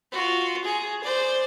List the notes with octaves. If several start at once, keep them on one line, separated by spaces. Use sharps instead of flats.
F4 F#4
G#4
C5 D5